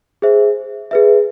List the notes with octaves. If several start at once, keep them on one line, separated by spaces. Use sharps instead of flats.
G#4 C5 E5
G#4 B4 E5